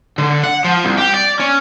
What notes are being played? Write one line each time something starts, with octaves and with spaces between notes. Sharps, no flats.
D3
F#5
F3
C2
G4
D5
C#4